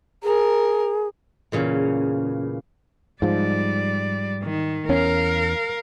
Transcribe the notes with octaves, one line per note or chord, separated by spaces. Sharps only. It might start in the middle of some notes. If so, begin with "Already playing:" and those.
G#4 A#4
E2 A#2 C#3
G#2 F3 G3 D5
D#3
E2 C#4 A#4 F5